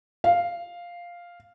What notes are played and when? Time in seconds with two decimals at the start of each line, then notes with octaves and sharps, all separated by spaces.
0.24 F5